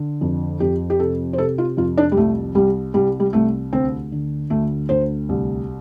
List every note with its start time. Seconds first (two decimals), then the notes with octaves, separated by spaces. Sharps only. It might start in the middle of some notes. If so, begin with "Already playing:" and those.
Already playing: D3
0.21 F2
0.60 F2 G4
0.90 G4
0.99 C3 A4
1.33 C5
1.38 C3 A4
1.58 F4
1.77 F2 F4
1.98 D4
2.12 G3
2.17 C2 A3
2.55 C2 G3
2.94 C2 G3
3.20 G3
3.33 C2 A3
3.73 D2 C4
4.12 D3
4.50 D2 A3
4.89 D2 C5
5.29 C2